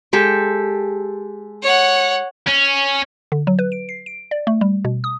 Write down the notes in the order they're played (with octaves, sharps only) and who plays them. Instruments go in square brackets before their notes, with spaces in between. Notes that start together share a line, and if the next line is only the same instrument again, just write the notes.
[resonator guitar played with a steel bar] G#3 G4 A4
[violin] C#5 F#5
[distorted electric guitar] C#4
[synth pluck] D3
F#3
B4
D7
C7
D7
D5
A3
G3
B2
D#6